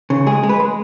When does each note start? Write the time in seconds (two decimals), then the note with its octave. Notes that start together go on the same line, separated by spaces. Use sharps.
0.10 C#3
0.26 G#3 G#4
0.43 G#3
0.49 B4
0.60 G#3